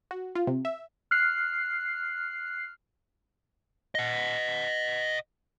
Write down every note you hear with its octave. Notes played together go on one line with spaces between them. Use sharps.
F#4
F4
C3
E5
F6 F#6 C7
D#5 F#5